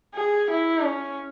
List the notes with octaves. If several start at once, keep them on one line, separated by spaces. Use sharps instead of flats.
G#4
E4
C#4